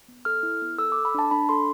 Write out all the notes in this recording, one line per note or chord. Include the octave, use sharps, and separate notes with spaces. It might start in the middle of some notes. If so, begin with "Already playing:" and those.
B3
A4 F6
E4
B3
A4 E6
A4 D6
B5
D4 A5
D4 B5
A4 C6